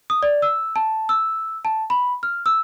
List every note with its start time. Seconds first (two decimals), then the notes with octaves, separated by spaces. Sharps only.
0.10 D#6
0.23 D5
0.42 E6
0.76 A5
1.09 E6
1.65 A5
1.90 B5
2.23 F6
2.46 E6